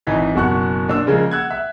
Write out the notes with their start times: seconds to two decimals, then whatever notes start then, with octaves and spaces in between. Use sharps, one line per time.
0.07 G#1 E3 D#4 B6
0.35 F#1 B2 F#4 C#6 F#6
0.88 A#2 D4 E6
1.07 C#3 F3 G#3 A#3
1.31 F#5 E6 F#6 G#6
1.51 E5